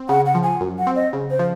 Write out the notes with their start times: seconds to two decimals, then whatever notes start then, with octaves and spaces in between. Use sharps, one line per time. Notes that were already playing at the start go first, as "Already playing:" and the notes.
Already playing: C4
0.09 C#3 F#5
0.26 F#5
0.34 F3
0.43 G#5
0.61 F#2
0.79 F#5
0.87 C4
0.95 D#5
1.13 C#3
1.31 C5
1.39 F3